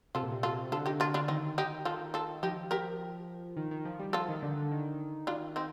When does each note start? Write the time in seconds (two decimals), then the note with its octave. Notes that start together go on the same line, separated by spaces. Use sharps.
0.15 C3 F4 A4
0.23 A#2
0.31 C3
0.43 F4 A4
0.72 D3 F4 A4
0.86 D#4 G4
1.00 D4 F4
1.14 D4 F4
1.28 D#3 C4 D#4
1.58 D#4 G4
1.85 D#3 F4 A4
2.14 F4 A4
2.43 F3 D#4 G4
2.71 G4 A#4
3.57 D#3
3.71 D#3
3.85 F3
3.99 G3
4.13 F3 F4 A4
4.29 D#3
4.43 D3
4.57 D3
4.71 D#3
5.27 D4 F4
5.56 C4 D#4